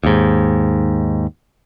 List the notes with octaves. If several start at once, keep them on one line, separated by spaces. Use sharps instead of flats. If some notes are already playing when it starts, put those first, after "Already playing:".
D#2 G#2